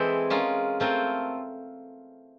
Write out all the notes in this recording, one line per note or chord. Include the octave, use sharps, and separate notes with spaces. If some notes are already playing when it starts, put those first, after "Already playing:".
Already playing: E3 G#3 C4 E4 A4
G#3 C#4 F4 A#4
A3 C4 F4 A#4